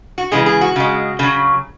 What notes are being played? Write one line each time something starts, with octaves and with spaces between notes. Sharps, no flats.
F#4
C#3 E3 G#3 G#4
G#4
F#4
C#3 G#3
C#3 F#3